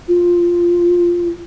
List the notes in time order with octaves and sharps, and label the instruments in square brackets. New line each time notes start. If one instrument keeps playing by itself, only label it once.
[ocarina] F4